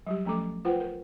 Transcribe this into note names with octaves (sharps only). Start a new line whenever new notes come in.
F#3 G3 G4
F3 A3 C#4 A4 D6
F4 B4 C5 F#5 G5
A#4